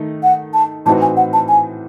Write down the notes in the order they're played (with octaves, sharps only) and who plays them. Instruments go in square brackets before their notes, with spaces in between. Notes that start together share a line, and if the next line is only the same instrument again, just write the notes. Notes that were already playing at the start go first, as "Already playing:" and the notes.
Already playing: [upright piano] D#3 A3 D#4
[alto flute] F#5
A5
[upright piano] A2 E3 C4 D#4 F#4 [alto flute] A5
[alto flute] G#5
F#5
A5
G#5